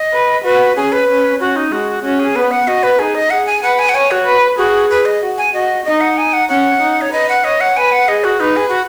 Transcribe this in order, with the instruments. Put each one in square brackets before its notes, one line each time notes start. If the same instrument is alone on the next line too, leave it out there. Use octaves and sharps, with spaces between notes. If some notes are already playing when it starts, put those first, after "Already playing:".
Already playing: [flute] D#5
[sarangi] B4
[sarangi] F#4 [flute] B4
[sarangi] C#4 [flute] G#4
[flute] B4
[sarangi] C#4
[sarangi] C#4 [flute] F#4
[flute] D#4
[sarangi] G#3 [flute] F#4
[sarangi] C#4 [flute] F#4
[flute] G#4
[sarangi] B3 [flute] B4
[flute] F#5
[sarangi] F#4 [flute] D#5
[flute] B4
[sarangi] D#4 [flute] G#4
[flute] D#5
[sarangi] G#4 [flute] F#5
[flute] G#5
[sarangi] B4 [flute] F#5
[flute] G#5
F#5
[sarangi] C#5 [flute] G#5
[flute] F#4
[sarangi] B4
[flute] F#4 [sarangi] G#4
[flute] B4
D#5
[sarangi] F#4
[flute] G#5
[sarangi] F#4 [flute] D#5
[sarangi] D#4 [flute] D#5
[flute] F#5
G#5
F#5
[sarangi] C#4 [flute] F#5
[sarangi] D#4
[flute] C#5
[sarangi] B4 [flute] D#5
[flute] F#5
[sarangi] C#5 [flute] D#5
[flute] F#5
[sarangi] B4 [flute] G#5
[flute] F#5
[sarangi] G#4 [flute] D#5
[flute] F#4
[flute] D#4 [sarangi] B4
[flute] G#4
F#4